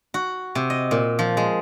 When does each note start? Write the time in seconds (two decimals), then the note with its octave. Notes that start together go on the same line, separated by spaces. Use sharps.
0.14 F#4
0.55 C3
0.70 D#5
0.91 A#2
1.19 F3
1.37 G#3